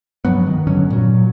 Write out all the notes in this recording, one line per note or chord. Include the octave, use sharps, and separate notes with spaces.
G2 F3 F#3 B3
D#3
G2 D3 F#3 C#4
A#2 F#3